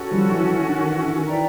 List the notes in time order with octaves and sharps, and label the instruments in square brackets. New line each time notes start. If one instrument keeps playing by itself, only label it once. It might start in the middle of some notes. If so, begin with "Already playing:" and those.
Already playing: [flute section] C#4 F#4 A4
[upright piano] F3 G3
E3 F#3
E3
D#3
E3
E3
D#3
[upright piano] E3 [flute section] B4 D5 G5 A#5